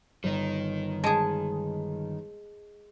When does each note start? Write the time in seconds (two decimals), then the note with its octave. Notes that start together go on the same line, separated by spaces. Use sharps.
0.24 G1 D#3 D#4
1.04 G#3 G#4 A5